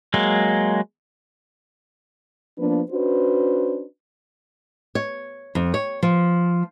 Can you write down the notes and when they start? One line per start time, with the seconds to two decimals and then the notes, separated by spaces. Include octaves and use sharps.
0.14 F#3 G#3 A#3
2.58 F3 A#3 B3 D4 B4
2.91 C#4 D4 F#4 B4 C5
4.95 C#5
5.55 F2
5.74 C#5
6.03 F3